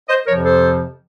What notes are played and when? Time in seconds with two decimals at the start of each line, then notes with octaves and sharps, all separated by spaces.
0.09 C5 D#5
0.27 F2 C3 F3 A#4 C#5
0.45 A4 C5